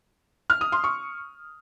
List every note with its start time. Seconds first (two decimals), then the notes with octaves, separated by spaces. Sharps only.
0.50 F6
0.61 D#6
0.72 C6
0.84 C#6